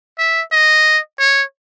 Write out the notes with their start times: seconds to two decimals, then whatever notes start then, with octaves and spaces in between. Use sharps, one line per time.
0.19 E5
0.52 D#5
1.19 C#5